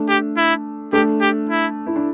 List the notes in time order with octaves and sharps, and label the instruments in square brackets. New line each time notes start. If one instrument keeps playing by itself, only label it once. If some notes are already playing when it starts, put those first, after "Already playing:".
Already playing: [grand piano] A3 D4
[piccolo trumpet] G4
E4
[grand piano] A3 D4 [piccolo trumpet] G4
[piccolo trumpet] G4
E4
[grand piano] E4
D4